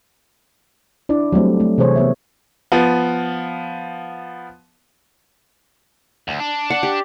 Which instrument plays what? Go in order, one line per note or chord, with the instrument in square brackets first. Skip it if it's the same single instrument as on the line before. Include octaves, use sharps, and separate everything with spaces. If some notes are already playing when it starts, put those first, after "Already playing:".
[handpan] D4 E4 D5
F#3 G3 A3 C4
A3
C3 E3 G#4 C5 C#5
B3 C#5 E5
[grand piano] F3 B3
[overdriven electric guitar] D2
D4
[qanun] D5 F#5
G4